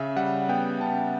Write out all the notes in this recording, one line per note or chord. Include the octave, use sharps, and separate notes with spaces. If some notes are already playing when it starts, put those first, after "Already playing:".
Already playing: C#3 E5
G3 F#5
B3 G5
C#3 A5